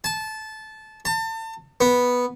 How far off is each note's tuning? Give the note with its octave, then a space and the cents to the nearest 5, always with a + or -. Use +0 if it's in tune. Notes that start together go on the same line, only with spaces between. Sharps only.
A5 -15
A5 +35
B3 -5